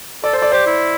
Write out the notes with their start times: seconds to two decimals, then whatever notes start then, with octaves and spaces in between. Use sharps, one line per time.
0.24 A4 D5
0.33 C5
0.38 A4 D5
0.52 G4 C5
0.67 E4